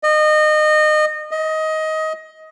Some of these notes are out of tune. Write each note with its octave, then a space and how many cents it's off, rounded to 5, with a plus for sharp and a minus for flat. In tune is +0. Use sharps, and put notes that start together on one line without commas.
D#5 -25
D#5 +20